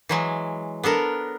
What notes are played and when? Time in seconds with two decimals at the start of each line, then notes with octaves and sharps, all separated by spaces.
0.09 E3 F#3 G#3
0.84 B3 D4 A4 A#4